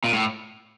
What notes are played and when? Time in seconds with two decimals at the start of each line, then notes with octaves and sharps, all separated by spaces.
0.04 A#2
0.13 A2